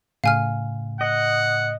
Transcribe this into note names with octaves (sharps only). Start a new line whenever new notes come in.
A2 C#3 F5 G#5 F6
D#5 F#5